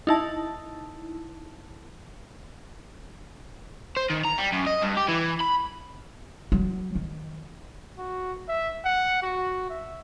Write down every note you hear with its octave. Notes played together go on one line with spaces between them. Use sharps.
D#4 E4 A5
C5
D#3
A#5
G3
F#2
D#5
G2
G4
E3
B5
F#3
D#3
F#4
E5
F#5
F#4
E5